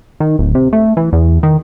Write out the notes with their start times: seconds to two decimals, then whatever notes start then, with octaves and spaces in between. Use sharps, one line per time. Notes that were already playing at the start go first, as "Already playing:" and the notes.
0.20 D#3
0.39 D1
0.55 C3
0.73 A3
0.97 E3
1.13 E2
1.43 D#3